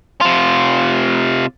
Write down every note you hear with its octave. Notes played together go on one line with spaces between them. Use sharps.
C3 F4